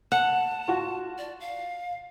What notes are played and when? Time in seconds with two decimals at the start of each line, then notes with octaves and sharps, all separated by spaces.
0.12 F#5 A5
0.68 F4 F#4
1.18 D5
1.40 F5